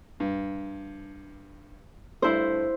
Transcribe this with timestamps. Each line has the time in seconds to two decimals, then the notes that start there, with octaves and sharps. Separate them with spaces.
0.20 G2
2.22 G2 A3 E4 C5